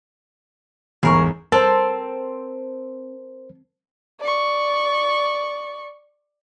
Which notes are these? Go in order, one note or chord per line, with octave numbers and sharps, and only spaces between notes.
G1 E2 G#2 G#4 A#4 C#6
C4 A4 A#4 C5
D5 C#6